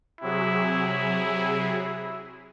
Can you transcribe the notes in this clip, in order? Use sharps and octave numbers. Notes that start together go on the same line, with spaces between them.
C3 F#3 E4 G#4